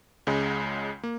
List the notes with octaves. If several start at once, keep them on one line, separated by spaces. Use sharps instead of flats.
C#2 C#3 G#3
A#3